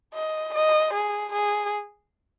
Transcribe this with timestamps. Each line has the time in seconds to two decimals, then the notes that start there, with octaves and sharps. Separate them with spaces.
0.14 D#5
0.54 D#5
0.94 G#4
1.33 G#4